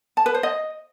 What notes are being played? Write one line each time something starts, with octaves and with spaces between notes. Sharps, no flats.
A5
B4
C5
D#5